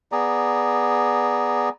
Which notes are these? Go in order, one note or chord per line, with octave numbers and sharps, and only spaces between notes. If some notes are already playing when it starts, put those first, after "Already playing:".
B3 G#4 D5 A#5